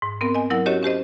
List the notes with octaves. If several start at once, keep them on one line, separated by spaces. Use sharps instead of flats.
G#2
B3 C4 A#4
D#5 G#5
F#3 E4 A#4 F#5
C#4 F#4 G4 C#5 D#5
C#4 G4 C5 D#5